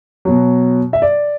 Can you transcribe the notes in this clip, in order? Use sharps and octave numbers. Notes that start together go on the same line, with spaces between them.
B2 F#3
E5
D5